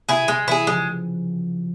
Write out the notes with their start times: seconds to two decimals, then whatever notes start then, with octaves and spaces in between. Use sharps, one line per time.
0.09 C3 E4 G#4
0.28 C3 G#3
0.47 C3 E3 E4 G#4
0.67 C#3 F3 G#3
0.77 E4